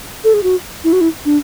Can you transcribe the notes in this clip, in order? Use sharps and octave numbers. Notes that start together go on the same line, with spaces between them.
A4
G#4
F#4
E4
F#4
E4
D4